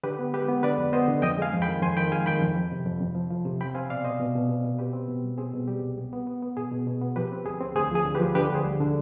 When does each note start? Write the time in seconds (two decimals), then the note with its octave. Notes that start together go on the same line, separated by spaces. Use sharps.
0.03 D3 G4 B4
0.19 B3
0.34 G#3 G4 B4
0.48 B3
0.63 D3 B4 D5
0.78 F2
0.93 B3 C5 D#5
1.08 D3
1.22 F2 D#5 G5
1.37 G#3 F5 G#5
1.53 F2
1.62 G5 B5
1.68 D#3
1.82 F2 G#5 C6
1.97 D#3 G5 B5
2.11 G#3 F5 G#5
2.26 D#3 G5 B5
2.42 F2
2.56 F3
2.72 C3
2.86 F2
3.01 F2
3.15 F3
3.31 F3
3.45 C3
3.61 C4 G5 B5
3.75 C4 F5 G#5
3.90 B2 D5 F5
4.04 B2 C5 D#5
4.20 B2
4.35 B2
4.49 B2
4.65 B2
4.78 C4 G4 B4
4.93 C4
5.08 B2
5.23 G3
5.38 C4 G#4
5.53 B2
5.68 G3 G4
5.82 C2
5.98 B3
6.13 B3
6.27 B3
6.42 B3
6.57 B2 G#4
6.72 B2
6.87 B2
7.01 B3
7.16 F3 G4 B4
7.32 C4
7.45 D2 G#4
7.60 C4
7.75 D2 G#4 C5
7.91 F3 G#4
8.05 D3
8.15 G4 B4
8.20 F3
8.35 D3 G4 B4
8.50 D2 G#4 C5
8.65 G3
8.80 D3